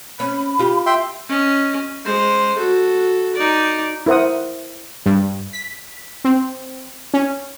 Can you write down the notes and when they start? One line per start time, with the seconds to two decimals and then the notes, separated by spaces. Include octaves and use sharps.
0.20 C#4 B5
0.59 F4 G4
0.86 E5 G5 C6
1.29 C#4 D#5
2.05 G#3 C5
2.58 F#4 A4
3.35 D#4 D5
4.06 E4 A#4 C5 F#5 D#6
5.06 G2
5.53 B6
6.24 C4
7.14 C#4